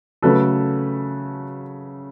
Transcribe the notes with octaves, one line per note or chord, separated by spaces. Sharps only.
C#3 F#3 A3 A4 B4